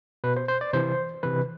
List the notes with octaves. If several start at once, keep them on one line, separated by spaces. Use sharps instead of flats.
B2 B4
C5
C5
D5
C3 E3 C5
C3 E3 B4